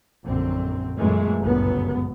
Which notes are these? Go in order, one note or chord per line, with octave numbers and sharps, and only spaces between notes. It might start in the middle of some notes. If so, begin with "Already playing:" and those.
A#1 F#2 D3 C4
F#2 A#2 E3 G#3 A3
G1 C#2 F#2 A#2 F#3 B3